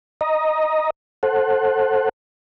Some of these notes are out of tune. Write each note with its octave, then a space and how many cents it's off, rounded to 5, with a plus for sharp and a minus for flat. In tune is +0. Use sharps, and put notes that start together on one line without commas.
D#5 +0 A#5 +10
A4 +0 C5 +25 F#5 +0